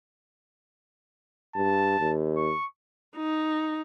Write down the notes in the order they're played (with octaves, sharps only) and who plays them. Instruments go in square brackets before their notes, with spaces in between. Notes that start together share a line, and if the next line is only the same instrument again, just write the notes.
[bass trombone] G2 [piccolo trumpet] A5
[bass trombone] D#2
[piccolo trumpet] C#6
[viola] D#4